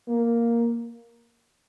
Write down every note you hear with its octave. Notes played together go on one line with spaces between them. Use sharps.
A#3